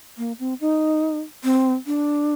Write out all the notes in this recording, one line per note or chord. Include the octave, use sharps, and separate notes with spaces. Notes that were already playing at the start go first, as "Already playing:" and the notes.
A#3
C4
D#4
C4
D4